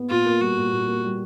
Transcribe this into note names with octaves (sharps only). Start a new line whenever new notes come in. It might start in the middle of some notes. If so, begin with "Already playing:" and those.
Already playing: B3
A#2 F4
A#3
G3 F#4
A#2
A#2
A#3
G3